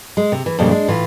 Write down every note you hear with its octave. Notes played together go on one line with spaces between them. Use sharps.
G#3
C3
E3
F2 A#2 C#3 G3 D4
G#3 D4
A2 E3 F4